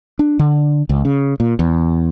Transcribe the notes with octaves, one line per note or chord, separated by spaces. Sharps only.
D4
D3
C#2
C#3
A#2
E2